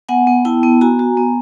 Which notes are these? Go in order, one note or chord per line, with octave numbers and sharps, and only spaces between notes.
B3 F#5 G#5
B3
E4 G5 A5
B3
F#4 G#5 A#5
F#4
B3